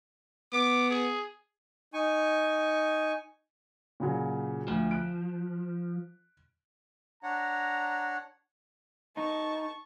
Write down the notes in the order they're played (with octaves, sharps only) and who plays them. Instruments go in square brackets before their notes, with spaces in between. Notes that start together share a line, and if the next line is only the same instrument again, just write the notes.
[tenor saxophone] B3 [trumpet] D6
[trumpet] G#4
[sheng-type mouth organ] D#4 G#5 C#6
[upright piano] A#2 C#3 F#3
[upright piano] D2 [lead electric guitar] F3
[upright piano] F#6 D7
[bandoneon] D4 C#5 F#5 [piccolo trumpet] A#5
[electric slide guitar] D#4 [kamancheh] A5 C#6